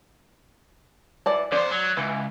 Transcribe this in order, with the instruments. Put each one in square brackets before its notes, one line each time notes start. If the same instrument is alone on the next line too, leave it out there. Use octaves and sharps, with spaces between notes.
[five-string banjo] E3 D5 A5
[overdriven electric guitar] F2 C5 [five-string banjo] D5
[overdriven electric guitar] F#3
[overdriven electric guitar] C#2 [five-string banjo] E3